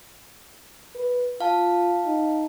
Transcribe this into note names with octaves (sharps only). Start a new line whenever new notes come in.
B4
F4 F5 A5
D#4